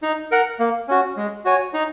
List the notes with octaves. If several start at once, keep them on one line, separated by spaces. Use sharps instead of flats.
D#4
A#4 F#5
A#3
C#4 F#4
G#3
F#4 C#5 G#5
D#4